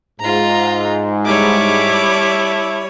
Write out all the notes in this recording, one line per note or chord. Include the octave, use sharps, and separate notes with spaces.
G#2 F4 A#5
G3 E4 C#5 E5 A5 D6